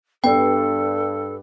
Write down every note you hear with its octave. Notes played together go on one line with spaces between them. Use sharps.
G2 B3 D4 A4 G5